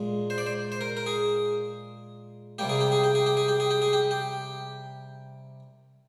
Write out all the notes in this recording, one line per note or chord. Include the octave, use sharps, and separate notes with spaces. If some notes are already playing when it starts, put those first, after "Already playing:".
Already playing: A#2 G#3
C5
D5
C5
C5
A#4
A#4
G#4
C3 G3 A#3 G4
G#4
G4
G#4
G4
G#4
G4
G#4
G4
G#4
G4
G#4
G4
G4